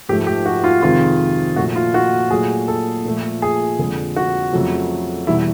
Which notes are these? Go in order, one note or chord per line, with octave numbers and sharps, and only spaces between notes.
G#2 F3 A3 G4
G4
F#4
F4
F2 C3 D#3 G#3 F4
A#2 F3 A3 F#4
F4
F#4
A#2 F#3 A3 G#4
A4
A#2 F3 A3
G#4
F2 D3 F3 G#3
F#4
F2 C#3 F#3 A3
E2 B2 G3 E4